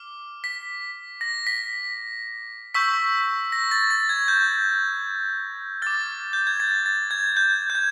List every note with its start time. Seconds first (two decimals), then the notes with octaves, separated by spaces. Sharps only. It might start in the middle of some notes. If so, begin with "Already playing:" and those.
Already playing: D6 F6
0.44 B6
1.21 A#6
1.47 B6
2.74 C#6 E6 G6 B6
3.52 A#6
3.72 A6
3.91 A6
4.09 G#6
4.28 G6
5.82 D6 F6 A6
6.33 G6
6.47 G#6
6.60 A6
6.86 A6
7.11 G#6
7.37 G6
7.70 G6
7.75 G#6